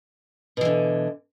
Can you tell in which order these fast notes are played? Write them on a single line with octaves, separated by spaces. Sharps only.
B2 E3 D3